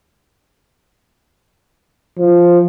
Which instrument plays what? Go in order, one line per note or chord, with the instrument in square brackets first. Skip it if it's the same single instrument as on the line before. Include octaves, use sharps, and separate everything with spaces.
[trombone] F3